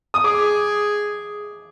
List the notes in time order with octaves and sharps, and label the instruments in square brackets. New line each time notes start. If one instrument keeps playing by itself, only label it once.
[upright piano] D#6
[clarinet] G#4 [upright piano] D6